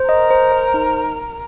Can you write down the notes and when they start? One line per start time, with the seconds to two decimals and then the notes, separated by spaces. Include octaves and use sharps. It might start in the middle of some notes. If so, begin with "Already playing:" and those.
Already playing: C5
0.08 A#4 D#5
0.31 C5
0.52 C5
0.74 D#4